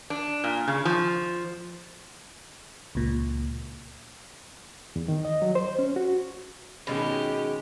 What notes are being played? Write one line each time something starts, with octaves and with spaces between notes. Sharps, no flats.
D4
A#2
C#3
F3
C#2 A#2
E2
D#3
D#5
F#3
C5
C#4
F#4
B2 D#3 G#3 C#4 G4